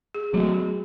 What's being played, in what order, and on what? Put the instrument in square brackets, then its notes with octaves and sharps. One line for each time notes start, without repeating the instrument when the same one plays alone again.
[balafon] G#4
[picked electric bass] F#3 A3 [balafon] F#4
[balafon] G#4